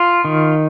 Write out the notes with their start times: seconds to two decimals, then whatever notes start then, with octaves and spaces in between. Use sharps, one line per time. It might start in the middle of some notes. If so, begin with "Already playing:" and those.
Already playing: F4
0.25 D#3